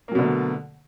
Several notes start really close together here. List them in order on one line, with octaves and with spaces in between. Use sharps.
A#3 F#3 B2 D3 A3